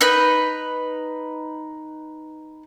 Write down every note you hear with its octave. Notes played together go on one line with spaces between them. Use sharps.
D#4 B4